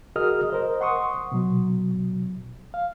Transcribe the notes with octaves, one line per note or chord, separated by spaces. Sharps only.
F#4 G#4 A#4 D#5 D#6 F6
A#4 C5 D#5
F#5 C6 C#6 D#6
B2 F#3
F5